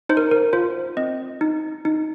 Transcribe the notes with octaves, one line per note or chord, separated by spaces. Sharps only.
D#4 C5
A#4
A#4
F4 C5
C4 D#5
D#4
D#4